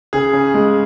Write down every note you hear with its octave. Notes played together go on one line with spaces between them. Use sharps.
C#3 G#4
C#3
G#3